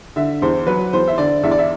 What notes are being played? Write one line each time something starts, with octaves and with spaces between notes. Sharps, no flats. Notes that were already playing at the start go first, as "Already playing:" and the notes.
D3 E5
E2 C5
F#3 B4
E2 C5
E5
D3 D5
E2 E5
D5
E5